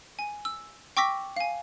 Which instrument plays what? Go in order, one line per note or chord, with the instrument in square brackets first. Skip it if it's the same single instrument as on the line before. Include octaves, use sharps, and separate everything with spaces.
[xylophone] G#5
E6
G5 C#6 D6 E6 A#6 B6
F5 G#5